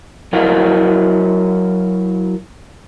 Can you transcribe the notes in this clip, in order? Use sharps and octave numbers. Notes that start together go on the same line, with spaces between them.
F#3 E4 A#4 D#5 F5 F#5